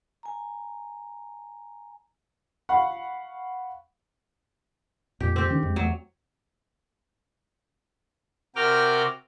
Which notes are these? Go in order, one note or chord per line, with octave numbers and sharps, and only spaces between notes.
G#5 A#5
F5 F#5 B5 C#6
F2 A#2 G4
C4 G4
D#3 C#4 D4
F2 G#3
E2 F#3 A3
C3 F#4 A#4 G5 D6 F6